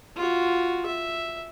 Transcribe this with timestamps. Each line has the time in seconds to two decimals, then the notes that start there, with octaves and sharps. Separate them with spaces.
0.16 F4 F#4
0.86 E5